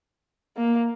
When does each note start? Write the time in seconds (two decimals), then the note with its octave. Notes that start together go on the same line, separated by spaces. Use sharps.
0.57 A#3